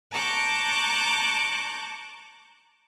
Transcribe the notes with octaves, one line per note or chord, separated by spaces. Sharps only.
A5 A#5 C#6 D6 F#6 G6